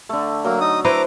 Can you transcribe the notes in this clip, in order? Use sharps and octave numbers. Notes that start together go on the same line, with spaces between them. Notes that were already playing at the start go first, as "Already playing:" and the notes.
D3 A3
F#3 A#3
D#4 D#6
E4 B4 C5 A#5 D6